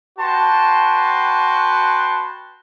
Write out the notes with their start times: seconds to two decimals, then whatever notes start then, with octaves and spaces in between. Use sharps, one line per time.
0.19 F#4 B4 G5 A5 C6